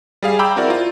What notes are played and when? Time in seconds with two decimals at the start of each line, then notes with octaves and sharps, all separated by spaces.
0.22 G3 G#4 F5
0.39 G5 A#5 B5 D6 E6 G6
0.56 C4 E4 F#4 A#4 D5
0.70 F4